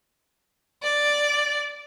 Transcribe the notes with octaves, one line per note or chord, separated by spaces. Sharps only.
D5